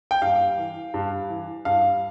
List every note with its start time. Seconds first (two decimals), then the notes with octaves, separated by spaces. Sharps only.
0.11 G5
0.22 G2 F5
0.58 E3
0.94 G2
1.30 E3
1.65 G2 F5